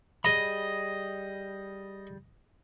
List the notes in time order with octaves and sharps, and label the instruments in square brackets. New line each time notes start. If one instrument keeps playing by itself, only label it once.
[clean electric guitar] G3 G#4 B5 [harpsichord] D#5